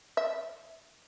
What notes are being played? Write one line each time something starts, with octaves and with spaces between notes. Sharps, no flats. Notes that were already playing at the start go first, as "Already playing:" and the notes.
E5